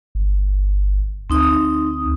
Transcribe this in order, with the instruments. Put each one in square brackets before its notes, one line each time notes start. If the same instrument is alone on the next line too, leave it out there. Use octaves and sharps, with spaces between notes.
[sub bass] G1
[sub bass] D2 [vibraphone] C4 D#4 D#6